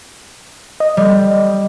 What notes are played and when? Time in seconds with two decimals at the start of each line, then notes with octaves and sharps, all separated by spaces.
0.80 D#5
0.97 G3